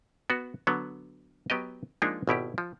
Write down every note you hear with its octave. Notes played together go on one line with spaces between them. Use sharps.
B3 F#4
D3 F#3 B3
F#3 B3 G4 D#5
F3 G#3 A#3 D4 D#4
G#1 B2 E4 G4
F3